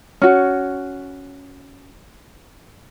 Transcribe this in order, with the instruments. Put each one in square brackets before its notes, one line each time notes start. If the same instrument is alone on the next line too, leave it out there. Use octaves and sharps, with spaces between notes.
[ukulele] C#4 F#4